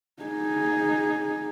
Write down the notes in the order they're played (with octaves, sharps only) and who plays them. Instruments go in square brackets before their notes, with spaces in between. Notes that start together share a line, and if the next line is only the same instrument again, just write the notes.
[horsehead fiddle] D#4 G#4